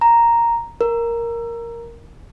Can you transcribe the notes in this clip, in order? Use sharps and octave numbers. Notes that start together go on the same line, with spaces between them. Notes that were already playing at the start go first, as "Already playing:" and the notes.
A#5
A#4